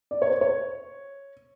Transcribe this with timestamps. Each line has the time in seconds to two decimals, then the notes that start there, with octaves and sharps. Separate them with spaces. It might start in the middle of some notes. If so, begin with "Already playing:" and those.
0.11 D5
0.22 C#5
0.31 C5
0.41 C#5